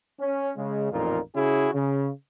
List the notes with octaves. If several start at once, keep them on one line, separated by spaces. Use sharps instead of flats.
C#4
C#3 G#3
A1 F2 A#2 D#4 F4 A#4
C#3 C#4 E4 F#4 G#4
C#3